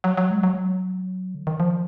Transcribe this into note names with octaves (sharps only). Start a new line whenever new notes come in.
F#3
F#3
G#3
F#3
D3
D#3
F3